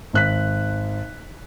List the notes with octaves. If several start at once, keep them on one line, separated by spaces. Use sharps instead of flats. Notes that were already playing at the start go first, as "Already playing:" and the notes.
G#1 F#6 B6